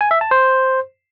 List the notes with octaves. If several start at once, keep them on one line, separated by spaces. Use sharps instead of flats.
G#5
E5
A5
C5